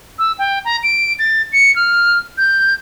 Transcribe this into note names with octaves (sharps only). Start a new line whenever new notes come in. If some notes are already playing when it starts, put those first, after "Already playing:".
E6
G5
A#5
D7
A6
C#7
F6
G6